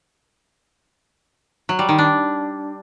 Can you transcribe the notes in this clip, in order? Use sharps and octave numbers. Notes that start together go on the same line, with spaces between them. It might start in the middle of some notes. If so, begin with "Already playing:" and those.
F#3
G3
D#3
D4